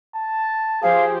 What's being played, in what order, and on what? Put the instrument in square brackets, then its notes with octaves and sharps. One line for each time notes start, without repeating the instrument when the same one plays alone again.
[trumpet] A5
[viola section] F3 G4 C5 [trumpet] G#4 [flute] F5